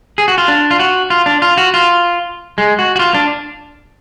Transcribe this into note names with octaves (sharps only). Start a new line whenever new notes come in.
G#4
F#4
F4
D4
F4
F#4
F4
D4
F4
F#4
F4
G#3
F#4
F#4
F4
D4